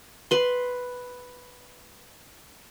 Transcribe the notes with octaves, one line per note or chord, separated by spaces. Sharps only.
B4 C6